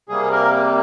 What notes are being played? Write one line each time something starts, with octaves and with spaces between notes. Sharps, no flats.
C3 G3 A#3 G#4
A#4